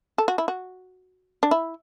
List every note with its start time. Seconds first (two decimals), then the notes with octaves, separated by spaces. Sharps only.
0.18 A4
0.28 F#4
0.38 E4
0.48 F#4
1.43 D4
1.51 E4